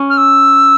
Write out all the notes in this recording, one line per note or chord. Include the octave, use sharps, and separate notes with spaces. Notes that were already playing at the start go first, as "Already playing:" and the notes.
Already playing: C#4
F6
E6